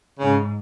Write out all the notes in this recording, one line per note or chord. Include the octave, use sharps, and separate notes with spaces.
G#2 C#3